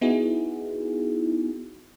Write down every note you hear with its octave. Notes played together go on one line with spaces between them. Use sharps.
B3 D#4 E4 F#4 G#4